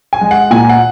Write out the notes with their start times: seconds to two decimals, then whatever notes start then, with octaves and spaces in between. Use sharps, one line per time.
0.13 G#5
0.21 G#3
0.31 F#5
0.51 A#2 G#5
0.69 F#5